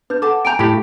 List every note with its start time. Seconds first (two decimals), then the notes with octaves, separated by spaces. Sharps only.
0.10 D4 B4 G6
0.22 A4 F#5 A5 D6
0.45 G5 G#5 A#5 G6 D7
0.59 A2 G4 B5